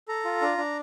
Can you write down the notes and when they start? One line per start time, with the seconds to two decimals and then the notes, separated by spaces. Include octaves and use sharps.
0.08 A4 A#5
0.25 F4
0.42 D4
0.58 D4